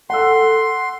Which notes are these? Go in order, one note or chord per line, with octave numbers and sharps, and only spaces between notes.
A4 F#5 C6 E6